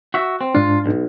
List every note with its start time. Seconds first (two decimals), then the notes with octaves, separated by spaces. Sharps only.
0.14 F#4 E5
0.41 C4
0.55 G#2 D4 F4
0.86 B1